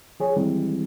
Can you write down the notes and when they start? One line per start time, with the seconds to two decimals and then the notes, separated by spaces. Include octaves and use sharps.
0.20 F3 G#4 C#5
0.36 D#3 E3 G3 G#3 C4 E4